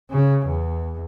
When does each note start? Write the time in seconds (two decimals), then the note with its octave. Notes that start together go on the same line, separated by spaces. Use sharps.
0.10 C#3
0.46 E2